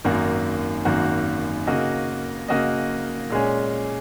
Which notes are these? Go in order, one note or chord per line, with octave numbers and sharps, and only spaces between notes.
G#1 F#2 D#3 A#3 F#4
G#1 F#2 D#3 A#3 F#4
C#3 A#3 F#4 D#5
C#3 A#3 F#4 D#5
A#2 G#3 C#4